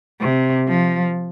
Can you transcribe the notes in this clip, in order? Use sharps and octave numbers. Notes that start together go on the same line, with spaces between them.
C3
F3